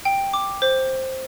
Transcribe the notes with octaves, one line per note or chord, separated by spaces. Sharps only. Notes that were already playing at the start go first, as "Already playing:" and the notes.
G5
D6
C5